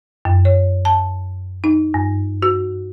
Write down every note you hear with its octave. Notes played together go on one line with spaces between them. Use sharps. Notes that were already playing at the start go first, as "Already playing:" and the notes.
F#2
C#5
A5
D#4
G2
F#4